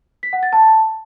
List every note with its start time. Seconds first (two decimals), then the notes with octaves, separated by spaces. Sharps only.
0.23 B6
0.33 F#5
0.43 A6
0.53 A5